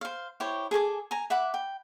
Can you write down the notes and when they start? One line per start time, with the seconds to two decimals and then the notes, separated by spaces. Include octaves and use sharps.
0.01 C5 F5
0.40 E4 G4 C5 C#5
0.71 G#4 A4 G#5 D6
1.11 G#5 A#5
1.30 E5 F#5 B5 D6
1.54 G5